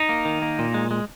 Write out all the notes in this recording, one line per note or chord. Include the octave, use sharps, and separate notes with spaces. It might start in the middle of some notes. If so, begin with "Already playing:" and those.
Already playing: D#4
A#3
D#3
A#3
A#2
G#3
G#3